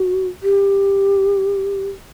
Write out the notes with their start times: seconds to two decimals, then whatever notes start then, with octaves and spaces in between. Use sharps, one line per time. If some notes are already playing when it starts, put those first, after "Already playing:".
Already playing: F#4
0.43 G4